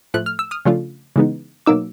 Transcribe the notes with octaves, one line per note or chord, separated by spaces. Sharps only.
A2 F3 A3 F#6
F6
E6
D#6 F6
C#3 F3 A3 D4 F4
C#3 E3 G#3 B3 D#4
B2 F#3 A#3 D#4 D6 E6